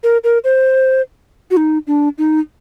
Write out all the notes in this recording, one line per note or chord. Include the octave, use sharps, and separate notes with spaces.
A#4
A#4
C5
F#4
D#4
D4
D#4